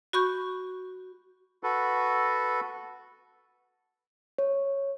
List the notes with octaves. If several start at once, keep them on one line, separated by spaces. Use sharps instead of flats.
F#4 B5 C#6 G6
F#4 A4 B4
C#5